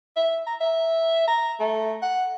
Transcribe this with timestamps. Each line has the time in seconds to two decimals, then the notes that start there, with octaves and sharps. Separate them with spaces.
0.16 E5
0.47 A#5
0.60 E5
1.28 A#5
1.60 A3
2.02 F#5